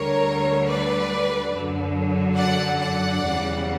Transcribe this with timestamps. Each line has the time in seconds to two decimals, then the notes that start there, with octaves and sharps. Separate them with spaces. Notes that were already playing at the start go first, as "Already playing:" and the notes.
Already playing: D2 D3 G3 A#4 C#5
0.68 B4 D5
1.53 F#2 D3 F#3
2.37 D5 F#5
2.80 D5 F#5
3.22 E2 C#3 G3